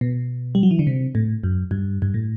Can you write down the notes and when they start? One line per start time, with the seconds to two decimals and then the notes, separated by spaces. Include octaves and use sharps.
0.01 B2
0.55 G3
0.63 F#3
0.71 E3
0.79 D3
0.87 C3
1.15 A2
1.43 F#2
1.71 G2
2.02 G2
2.14 A2